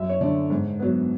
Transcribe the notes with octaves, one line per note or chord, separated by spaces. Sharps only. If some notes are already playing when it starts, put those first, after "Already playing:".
Already playing: F#2 E5
C#5
D3 A3 D5
G#2
F#3 B3